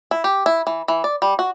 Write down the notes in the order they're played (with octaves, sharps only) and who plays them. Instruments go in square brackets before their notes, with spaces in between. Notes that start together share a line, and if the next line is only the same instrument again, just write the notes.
[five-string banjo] E4
G4
E4
E3
E3
D5
G3
F#4